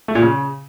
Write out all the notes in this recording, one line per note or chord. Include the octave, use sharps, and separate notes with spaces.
A3
A#2
C#3